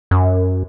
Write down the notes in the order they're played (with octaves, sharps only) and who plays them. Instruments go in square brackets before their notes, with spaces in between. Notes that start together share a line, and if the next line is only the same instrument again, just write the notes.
[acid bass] F#2